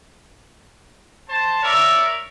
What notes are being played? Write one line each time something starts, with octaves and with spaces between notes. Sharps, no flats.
C5 A5
A#4 C#5 D5 E5